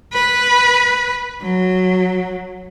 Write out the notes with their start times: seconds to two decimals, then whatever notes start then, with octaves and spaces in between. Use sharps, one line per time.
0.13 B4
1.41 F#3